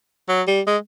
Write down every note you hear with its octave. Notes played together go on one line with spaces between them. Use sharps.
F#3
G3
G#3